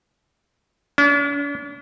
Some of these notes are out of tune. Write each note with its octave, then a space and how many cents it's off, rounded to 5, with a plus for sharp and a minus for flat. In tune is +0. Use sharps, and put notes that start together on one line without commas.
D4 -45